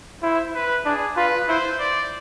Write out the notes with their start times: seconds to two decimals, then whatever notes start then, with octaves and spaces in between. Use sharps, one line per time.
0.23 E4 C5
0.54 B4
0.85 D4 G#4
1.16 F4 B4
1.49 E4 C5
1.79 D5